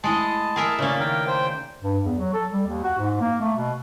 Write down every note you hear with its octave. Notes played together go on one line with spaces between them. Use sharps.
G#3 A3 E4 D#5 A5
G#4 A#4 E5
C#3 A#3 C#4 C#5 D5 E5
D#3 A#4 G5
C5 G5
G2
E2
F#3
A4
G3
D#2
F#4
G#2
A#3
A3
B2